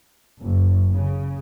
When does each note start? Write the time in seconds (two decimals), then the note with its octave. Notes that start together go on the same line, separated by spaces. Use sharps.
0.41 F#1
0.93 C#3